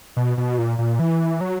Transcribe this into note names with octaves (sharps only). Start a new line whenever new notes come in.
B2
B2
A#2
A#2
E3
F#3